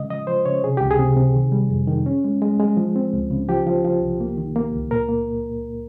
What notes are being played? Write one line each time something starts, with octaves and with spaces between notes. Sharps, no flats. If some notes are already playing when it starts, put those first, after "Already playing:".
Already playing: C#3 G#3 D#5
F3 D#5
F3 C5
C#3 C#5
C3 G#4
C#2 G4
G#4
C3
C3
D#3
G3
F2
D#3
C#4
G#3
G#3
G#3
F3
C4
C#2
C#3
F3 G4
F3
F3
C2
A#3
D#3
A#3
C#2
A#2 A#4
A#3